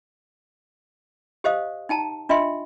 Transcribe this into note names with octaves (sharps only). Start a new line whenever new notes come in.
G4 C5 D#5 F5 D#6
D#4 G5 A5 A#5
D4 F4 D#5 E5 G5 C6